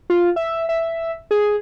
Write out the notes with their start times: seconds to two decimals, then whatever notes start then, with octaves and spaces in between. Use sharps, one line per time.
0.10 F4
0.36 E5
0.69 E5
1.31 G#4